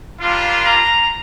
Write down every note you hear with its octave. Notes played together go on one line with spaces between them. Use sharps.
G3 A#3 D4 F4
A#5